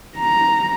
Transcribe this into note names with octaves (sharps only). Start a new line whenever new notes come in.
A#5